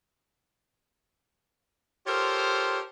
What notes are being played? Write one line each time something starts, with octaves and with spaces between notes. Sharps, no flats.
F4 G4 A4 A#4 C5 C#5